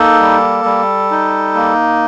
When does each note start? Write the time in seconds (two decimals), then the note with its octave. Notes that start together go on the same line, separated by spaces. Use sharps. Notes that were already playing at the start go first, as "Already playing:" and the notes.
Already playing: A#3 D#4 A4
0.19 G3
0.65 G3
1.11 D#4
1.55 A#3